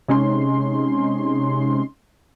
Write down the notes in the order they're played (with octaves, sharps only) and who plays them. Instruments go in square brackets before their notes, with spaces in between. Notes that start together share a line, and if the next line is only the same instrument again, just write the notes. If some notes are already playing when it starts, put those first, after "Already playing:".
[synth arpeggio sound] C3 G#3 C#4 D#4 C6